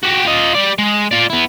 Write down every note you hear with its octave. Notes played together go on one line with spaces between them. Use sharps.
F#4 G4
F4 D#5
G3 D5
G#3
F4 D5
B3 E4